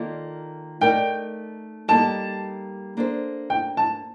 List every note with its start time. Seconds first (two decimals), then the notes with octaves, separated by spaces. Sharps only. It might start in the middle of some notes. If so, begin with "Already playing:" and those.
Already playing: D#3 A#3 F4 A4 D5
0.81 A3 D#4 A#4 D5 G5
1.88 G3 A#3 D#4 A4 A5
2.97 A#3 D4 A4 C5
3.50 G5
3.77 A5